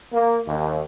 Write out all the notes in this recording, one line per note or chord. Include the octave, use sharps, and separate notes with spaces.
A#3
D#2